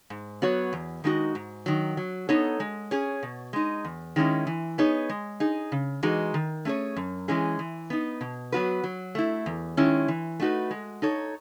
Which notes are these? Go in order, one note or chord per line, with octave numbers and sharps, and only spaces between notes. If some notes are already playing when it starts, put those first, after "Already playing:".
G#2
F#3 B3 F#4 C#5
E2
D#3 G#3 D#4 F#4
G#2
D#3 F#3
F#3
B3 D#4 A4 C#5
G#3
C#4 G#4 C#5
B2
G#3 D#4
E2
D#3 G#3 C#4 E4
E3
B3 D#4 G#4 C#5
G#3
D#4 G#4
C#3
E3 G#3 D#4 F#4
D#3
A3 C#4 G#4 C#5
F#2
E3 G#3 C#4 G#4
E3
B3 D#4
B2
F#3 B3 F#4 B4
F#3
A3 E4
E2
D#3 G#3 C#4 E4
E3
A3 D#4 F#4 B4
G#3
D#4 A4 C#5